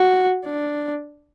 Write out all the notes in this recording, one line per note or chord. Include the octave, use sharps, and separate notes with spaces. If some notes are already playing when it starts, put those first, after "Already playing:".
Already playing: F#4
D4